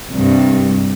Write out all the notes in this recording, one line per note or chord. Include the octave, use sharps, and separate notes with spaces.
C2 G2